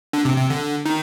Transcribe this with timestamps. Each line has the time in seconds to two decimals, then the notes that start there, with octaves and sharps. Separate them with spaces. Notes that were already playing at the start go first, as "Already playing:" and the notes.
0.13 D3
0.25 C3
0.38 C3
0.50 D3
0.86 D#3